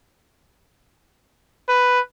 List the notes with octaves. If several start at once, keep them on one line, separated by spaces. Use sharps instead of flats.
B4